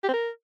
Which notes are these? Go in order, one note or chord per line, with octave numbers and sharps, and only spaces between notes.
G4
C4
A#4